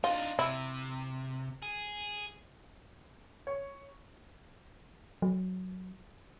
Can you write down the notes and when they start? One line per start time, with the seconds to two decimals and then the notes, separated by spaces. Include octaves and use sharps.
0.04 D4 D#4 F4
0.39 C3 E4
1.63 G#4
3.47 C#5
5.22 F#3